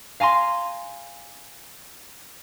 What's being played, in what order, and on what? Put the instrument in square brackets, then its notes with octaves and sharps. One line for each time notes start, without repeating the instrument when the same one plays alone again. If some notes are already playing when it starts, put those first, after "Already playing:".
[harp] F5 G#5 A#5 C6